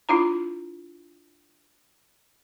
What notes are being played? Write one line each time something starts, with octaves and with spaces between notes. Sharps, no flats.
D4 E4 F4 A#5